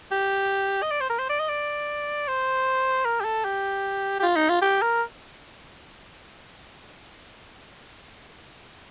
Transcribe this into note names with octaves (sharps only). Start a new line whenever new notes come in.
G4
D#5
D5
C5
A#4
C5
D5
D#5
D5
C5
A#4
G4
A4
G4
G4
F4
D#4
F4
G4
A#4